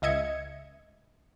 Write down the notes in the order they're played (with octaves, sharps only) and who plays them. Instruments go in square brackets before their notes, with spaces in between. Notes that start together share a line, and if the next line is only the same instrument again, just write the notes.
[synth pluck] C#2 D#5 E5 G#6 C#7